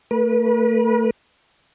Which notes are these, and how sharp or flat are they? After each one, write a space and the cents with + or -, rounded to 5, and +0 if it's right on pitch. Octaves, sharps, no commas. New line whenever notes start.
A3 +25 B4 -40